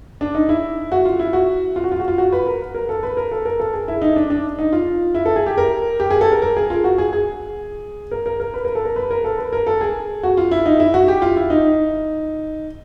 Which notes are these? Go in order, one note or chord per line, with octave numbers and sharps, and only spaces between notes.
D4
D#4
E4
F#4
F4
E4
F#4
F4
F#4
F4
F#4
F4
F#4
B4
A#4
A#4
A4
B4
A#4
A4
A#4
A4
G#4
E4
D#4
D4
D4
D#4
F4
E4
A4
G#4
G4
A#4
G4
G#4
A4
A#4
A#4
G#4
F4
F#4
G#4
G#4
A#4
A#4
A#4
B4
A#4
A4
A#4
B4
A#4
A4
B4
A#4
A4
G#4
F#4
F4
E4
D#4
E4
F#4
G4
F4
E4
D#4